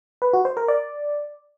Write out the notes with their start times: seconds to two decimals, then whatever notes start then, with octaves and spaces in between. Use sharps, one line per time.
0.22 B4
0.33 F#4
0.45 C5
0.57 A#4
0.68 D5